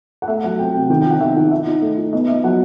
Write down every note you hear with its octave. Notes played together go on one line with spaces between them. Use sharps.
F#5
A3 E5
F#3 F#5
C4 G5
C3 G5
D#3 G5
G5
D#3 F#5
D#3 E5
E5
D#4 F#5
D#4 E5
D#4
A3
D#4
B3 D#5
B3 E5
F#3 F#5